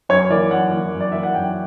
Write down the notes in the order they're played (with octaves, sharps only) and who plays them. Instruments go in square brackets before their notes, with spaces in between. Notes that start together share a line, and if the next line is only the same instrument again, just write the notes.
[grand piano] F#2 C#5
E3 A#3 D5
F#2 F#5
E3 A#3
F#2
D5
E3 A#3 E5
F#5
F#2 G5